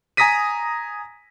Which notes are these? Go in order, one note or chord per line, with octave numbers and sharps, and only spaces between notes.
G#5 A#5 D#6 A#6 B6 D#7